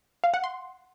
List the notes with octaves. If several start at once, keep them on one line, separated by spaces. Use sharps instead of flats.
F5
F#5
C6